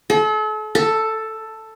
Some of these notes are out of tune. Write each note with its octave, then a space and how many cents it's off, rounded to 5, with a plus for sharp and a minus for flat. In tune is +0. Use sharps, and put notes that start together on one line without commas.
A4 -40
A4 +5